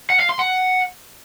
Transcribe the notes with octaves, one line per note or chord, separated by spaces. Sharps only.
F#5
F5
C6
F#5